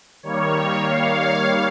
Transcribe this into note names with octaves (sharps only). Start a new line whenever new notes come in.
D#3 G3 A#3 C#5
F5